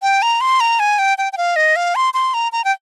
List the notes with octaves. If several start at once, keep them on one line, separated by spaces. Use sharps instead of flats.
G5
A#5
C6
A#5
G#5
G5
G5
G5
F5
D#5
F5
C6
C6
A#5
A#5
G5